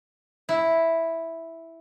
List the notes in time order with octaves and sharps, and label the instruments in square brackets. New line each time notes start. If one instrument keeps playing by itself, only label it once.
[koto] E4